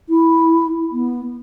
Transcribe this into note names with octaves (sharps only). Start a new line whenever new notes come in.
E4
B3